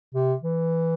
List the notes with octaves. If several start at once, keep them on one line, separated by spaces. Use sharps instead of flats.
C3
E3